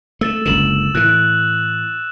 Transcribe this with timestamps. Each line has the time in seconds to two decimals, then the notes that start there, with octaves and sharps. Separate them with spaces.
0.21 A3 E6 A6 E7
0.46 F#1 C#2 D3 E7 F#7
0.95 A2 E3 F#6